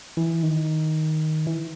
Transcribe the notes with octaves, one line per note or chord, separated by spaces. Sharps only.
E3
D#3
E3